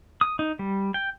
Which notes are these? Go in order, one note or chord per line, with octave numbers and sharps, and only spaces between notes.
D#6
D#4
G3
G5